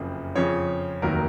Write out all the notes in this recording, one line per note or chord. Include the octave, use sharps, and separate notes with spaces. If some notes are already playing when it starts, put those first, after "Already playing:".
Already playing: F#1 F2 C#3
F2 C#3 F3 C#5
F1 D#2 D#3 F#3 A#4